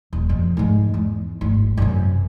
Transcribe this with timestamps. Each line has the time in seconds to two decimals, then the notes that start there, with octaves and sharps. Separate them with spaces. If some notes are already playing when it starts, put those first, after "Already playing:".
0.13 D#1
0.29 F2 C3
0.57 G#2 G#3
0.94 E2
1.41 D1 G#1
1.77 F#2 C3